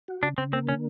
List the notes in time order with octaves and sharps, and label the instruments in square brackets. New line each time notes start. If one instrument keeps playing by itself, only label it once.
[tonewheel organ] F#4
[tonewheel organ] C#3 [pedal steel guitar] D4
[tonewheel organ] C#3 [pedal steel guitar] C4
[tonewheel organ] A#3 [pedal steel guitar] C4
[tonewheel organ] D3 [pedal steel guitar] C#4